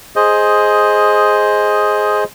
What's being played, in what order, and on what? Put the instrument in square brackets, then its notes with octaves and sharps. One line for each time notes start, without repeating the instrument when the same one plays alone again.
[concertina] G#4 C5 D#5